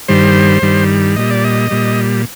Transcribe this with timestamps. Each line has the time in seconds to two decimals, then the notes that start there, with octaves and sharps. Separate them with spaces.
0.08 G2 D#3 G3 C5
0.62 G2 D#3 G3
1.16 A#2 G3 D#5
1.30 D5
1.44 D#5
1.71 A#2 G3